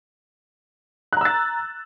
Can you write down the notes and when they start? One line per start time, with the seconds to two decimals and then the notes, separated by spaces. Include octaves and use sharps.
1.13 F#6
1.17 A#5
1.21 E6
1.25 A6